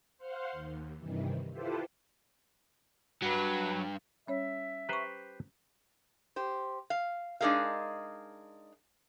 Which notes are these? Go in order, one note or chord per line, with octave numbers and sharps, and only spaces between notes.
C5 F5 F#5 C6
D#2
G2 C3 D#3 E3
E4 F4 G4 A4 B4 C5
G2 F#3 B4
G3 C#4 C#5 E5
G4 B4 C5 A#5 C#6
G4 C5
F5
G#3 D4 D#4 G#4 A#4 F5